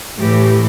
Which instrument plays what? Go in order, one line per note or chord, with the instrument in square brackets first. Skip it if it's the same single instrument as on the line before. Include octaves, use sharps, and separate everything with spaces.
[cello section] A2 E3 A3 G4